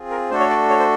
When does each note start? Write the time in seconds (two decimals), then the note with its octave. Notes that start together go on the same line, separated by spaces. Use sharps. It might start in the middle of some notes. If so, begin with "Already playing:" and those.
Already playing: C4 F4 G#4
0.11 A#4
0.30 A3 D4 F#4 A4 C5
0.40 C#5
0.50 D5
0.70 C#5
0.79 C5